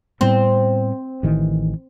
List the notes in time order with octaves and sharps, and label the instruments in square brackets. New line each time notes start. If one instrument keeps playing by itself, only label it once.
[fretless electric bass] A2 G3 B3 [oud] C4
[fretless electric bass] A1 D#3 E3